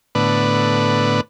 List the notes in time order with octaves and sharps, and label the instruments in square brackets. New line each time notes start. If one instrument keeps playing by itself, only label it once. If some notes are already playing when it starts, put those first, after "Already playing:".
[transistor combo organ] A2 D3 B3 B4 D5